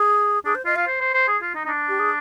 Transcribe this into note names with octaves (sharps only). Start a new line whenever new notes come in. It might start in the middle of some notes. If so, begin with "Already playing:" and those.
Already playing: G#4
D4 G#4
C5
F4 D#5
F4 F5
C5
C5
C5
G#4
F4
D#4
D#4
D4
G4
G#4